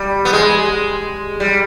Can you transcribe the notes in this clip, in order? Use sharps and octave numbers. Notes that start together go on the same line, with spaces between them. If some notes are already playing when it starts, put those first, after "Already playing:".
Already playing: G3
B3
G#3
G3